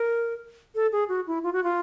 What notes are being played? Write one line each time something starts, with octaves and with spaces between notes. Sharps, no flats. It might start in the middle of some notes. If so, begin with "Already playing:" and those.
Already playing: A#4
A4
G#4
F#4
E4
F4
F#4
F4